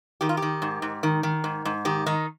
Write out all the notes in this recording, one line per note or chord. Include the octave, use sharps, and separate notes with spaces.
D#3 G4
F4
G4
D#3
G#2
G#2
D#3
D#3
G#2
G#2
D#3 G4
D#3 D#4